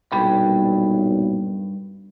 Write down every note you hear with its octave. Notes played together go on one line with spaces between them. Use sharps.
B1 G2 A#2 G5 B5